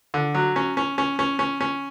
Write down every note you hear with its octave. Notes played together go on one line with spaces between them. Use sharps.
D3
F#3
C#4
C#4
C#4
C#4
C#4
C#4